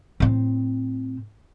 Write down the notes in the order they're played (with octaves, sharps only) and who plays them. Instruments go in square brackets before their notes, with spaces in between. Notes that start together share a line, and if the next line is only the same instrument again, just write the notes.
[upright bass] A2 C4